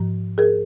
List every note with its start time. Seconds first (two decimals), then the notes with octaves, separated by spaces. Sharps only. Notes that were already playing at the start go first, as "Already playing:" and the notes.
Already playing: G#2 F3
0.38 G#4 A#4